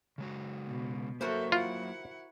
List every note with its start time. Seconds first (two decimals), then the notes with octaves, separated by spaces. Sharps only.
0.18 C#3 G#3 F#4
0.67 B2
1.21 F#3 A#3 F#4 A4 A#4 C5 E5
1.52 E4 F4 F#5